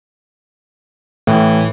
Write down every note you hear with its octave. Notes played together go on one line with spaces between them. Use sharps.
A2 E3